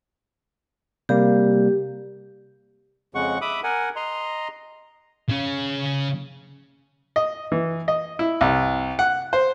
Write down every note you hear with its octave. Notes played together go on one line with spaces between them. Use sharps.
C3 G3 A#3 G4
F2 C#3 G#3 F#5 C#6
E5 B5 D6 D#6
A#4 F#5 G#5
D#5 A#5 C6
C#3 C#4
D#5
E3
D#5
E4
C2
F#5
C5